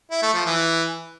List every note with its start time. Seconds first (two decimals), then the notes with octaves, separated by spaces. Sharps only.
0.11 E4
0.22 A3
0.34 F3
0.45 E3